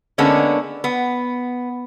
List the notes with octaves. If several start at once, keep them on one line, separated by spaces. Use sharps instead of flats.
D3 G#3 A#3 B3 C#4 D4
B3